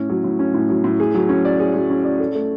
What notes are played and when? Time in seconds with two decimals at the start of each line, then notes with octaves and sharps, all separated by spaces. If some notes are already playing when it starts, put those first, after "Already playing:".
Already playing: A2 C#4
0.09 F#3
0.24 A2
0.39 C#4
0.54 A2
0.69 F#3
0.84 A2
1.00 G#4
1.14 F#3
1.29 C#4
1.45 D5
1.60 G#4
1.74 F#3
1.90 C#4
2.05 D5
2.20 A4
2.35 A3